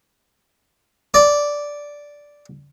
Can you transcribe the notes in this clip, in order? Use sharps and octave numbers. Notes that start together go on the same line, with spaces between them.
D5